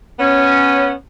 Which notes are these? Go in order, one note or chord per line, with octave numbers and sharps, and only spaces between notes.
B3 C#4